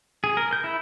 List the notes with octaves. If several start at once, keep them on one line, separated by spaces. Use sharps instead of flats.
G#4
A#4
G6
E4